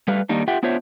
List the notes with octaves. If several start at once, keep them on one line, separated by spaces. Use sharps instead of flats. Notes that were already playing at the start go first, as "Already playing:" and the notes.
G3 A3 B4 F5
D#3 G3 A#3 D4 D#4
F4 G4 E5 F#5 G5
B3 D4 F4 C5 C#5 E5